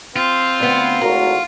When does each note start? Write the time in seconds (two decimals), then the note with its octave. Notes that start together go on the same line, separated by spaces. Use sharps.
0.16 C4 F4
0.60 D2 B3
1.01 G#1 A2 F#4 A#4